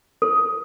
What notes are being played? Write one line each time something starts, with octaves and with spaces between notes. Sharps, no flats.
A4